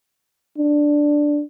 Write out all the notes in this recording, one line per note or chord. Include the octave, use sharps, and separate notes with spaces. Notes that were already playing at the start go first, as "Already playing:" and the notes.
D4